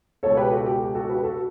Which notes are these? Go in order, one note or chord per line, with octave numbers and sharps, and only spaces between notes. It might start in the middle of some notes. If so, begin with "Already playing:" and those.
C#2 B2 A4 C#5
G4 B4
F#4 A4
G4
G4
F#4 A4
G4 B4
F#4 A4